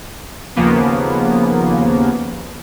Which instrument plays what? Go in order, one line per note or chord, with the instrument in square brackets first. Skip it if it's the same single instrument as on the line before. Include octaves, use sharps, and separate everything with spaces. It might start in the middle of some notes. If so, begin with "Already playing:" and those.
[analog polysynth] D#2 C#3 F3 A#3 B3